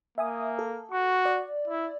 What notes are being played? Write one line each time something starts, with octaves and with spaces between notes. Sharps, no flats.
A#3 E5 G#5 D#6
A4
F#4 C#6
D5
E4